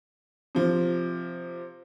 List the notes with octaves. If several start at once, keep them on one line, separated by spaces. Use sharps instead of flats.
C3 F3